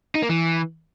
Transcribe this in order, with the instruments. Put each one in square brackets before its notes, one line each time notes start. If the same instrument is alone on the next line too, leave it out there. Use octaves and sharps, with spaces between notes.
[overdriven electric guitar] D#4
A#3
E3